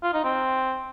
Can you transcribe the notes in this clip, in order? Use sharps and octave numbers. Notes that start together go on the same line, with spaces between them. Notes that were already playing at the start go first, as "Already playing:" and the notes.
F4
D#4
C4